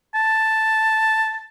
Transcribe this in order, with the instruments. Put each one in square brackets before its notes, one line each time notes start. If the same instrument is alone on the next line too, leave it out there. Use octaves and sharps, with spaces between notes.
[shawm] A5